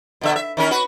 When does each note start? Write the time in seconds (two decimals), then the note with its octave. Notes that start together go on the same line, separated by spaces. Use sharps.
0.21 B2 D3 E5
0.36 E5
0.57 D#3 C#4 A#4
0.71 F#4 B4